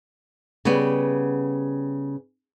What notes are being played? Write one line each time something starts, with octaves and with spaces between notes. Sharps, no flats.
C#3 G3 B3